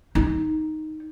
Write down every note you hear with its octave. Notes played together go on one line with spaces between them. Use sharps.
D#4